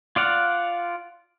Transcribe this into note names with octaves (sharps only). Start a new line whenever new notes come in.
F4 D5 F5 F#5